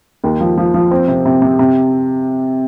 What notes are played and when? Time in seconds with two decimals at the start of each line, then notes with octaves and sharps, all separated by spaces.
0.24 D#2
0.41 F3
0.58 F3
0.74 F3
0.91 C4
1.08 C3
1.25 C3
1.42 C3
1.59 C3